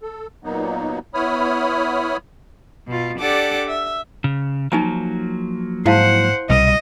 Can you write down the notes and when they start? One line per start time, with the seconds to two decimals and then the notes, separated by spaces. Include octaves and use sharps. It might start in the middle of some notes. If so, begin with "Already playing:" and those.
0.01 A4
0.44 A#2 F#3 A#3 B3 D#4
1.14 B3 E4 C#5 B5 D#6 F6
2.87 B2 F4
3.20 D4 G4 A4 D5 F#5 D6
3.67 E5
4.24 C#3
4.72 F3 F#3 A#3 D#4 G#5 A#5
5.86 G#2 E4 C5 F5 F#5 A5
6.50 C2 B2 G3 D#5